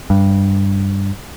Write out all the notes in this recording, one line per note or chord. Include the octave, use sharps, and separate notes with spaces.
G2